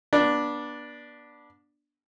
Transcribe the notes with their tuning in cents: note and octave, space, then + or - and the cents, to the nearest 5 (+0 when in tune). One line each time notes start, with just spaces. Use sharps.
B3 -35 D4 +0